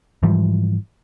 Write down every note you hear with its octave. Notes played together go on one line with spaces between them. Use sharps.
G#2 E3 F3 G3